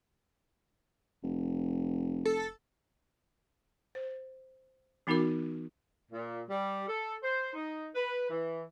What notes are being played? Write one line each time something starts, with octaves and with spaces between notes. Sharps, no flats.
F1
A4
C5
E3 B3 D#4 F#4 A#4 D6
A#2
G3
A4
C5
D#4
B4
E3